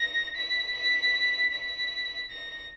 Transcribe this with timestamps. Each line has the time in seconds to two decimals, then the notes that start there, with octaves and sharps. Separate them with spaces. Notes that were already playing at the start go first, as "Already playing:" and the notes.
Already playing: A#6
0.35 B6
0.74 B6
1.52 B6
2.30 A#6